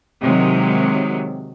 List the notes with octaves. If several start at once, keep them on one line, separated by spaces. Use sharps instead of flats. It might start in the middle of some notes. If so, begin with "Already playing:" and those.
C3 D#3 F#3 G#3